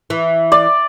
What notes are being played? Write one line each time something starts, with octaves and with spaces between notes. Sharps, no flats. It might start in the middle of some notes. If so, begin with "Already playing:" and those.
E3
D5